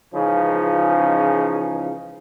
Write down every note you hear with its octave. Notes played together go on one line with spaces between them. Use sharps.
C#2 C#3 E3 F3 D#4 G#4